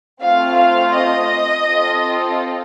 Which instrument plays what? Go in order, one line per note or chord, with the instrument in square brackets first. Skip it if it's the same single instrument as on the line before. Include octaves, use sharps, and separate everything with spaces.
[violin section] A3 C4 F4 F5
F5
D#5
C4 F4 A4